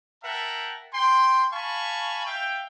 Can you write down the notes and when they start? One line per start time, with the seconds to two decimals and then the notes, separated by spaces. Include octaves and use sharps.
0.23 A#4 E5 F#5 G5 A5
0.94 G5 C6
1.52 F5 G#5 A5 B5 C#6
2.26 E5 F5 G5